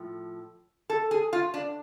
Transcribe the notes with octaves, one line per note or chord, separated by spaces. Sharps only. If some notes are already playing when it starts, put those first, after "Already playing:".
Already playing: A2 F3
A4
G#4
F4
D4